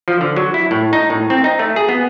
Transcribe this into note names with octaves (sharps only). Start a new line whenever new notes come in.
F3
D3
F#3
E4
A2
D#4
A2
C4
D#4
A3
G#4
B3